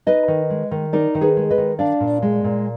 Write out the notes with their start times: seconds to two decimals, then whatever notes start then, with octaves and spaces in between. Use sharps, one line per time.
0.07 D#4 B4 D#5
0.28 D#3
0.50 G#3
0.71 D#3
0.93 D#4 A#4 D5
1.15 D#3
1.21 G#4 B4
1.37 G#3
1.50 B4 D#5
1.58 D#3
1.79 D4 D5 F5
2.00 A#2
2.22 G#3
2.44 A#2